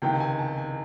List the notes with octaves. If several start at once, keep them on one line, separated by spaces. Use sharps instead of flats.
C#2 C3 D#3 G5
G#5
A5
G#5